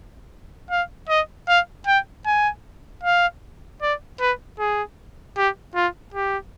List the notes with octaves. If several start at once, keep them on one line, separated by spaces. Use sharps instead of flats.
F5
D#5
F5
G5
G#5
F5
D5
B4
G#4
G4
F4
G4